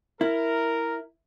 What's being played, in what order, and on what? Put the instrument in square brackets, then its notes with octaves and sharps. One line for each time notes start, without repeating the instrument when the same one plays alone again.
[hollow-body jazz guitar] E4 [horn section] A#4